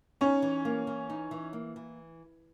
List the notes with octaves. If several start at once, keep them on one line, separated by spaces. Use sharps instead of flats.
C#4 D#4 C#5
E3
A#3
E3
D#4
E3
A#3
E3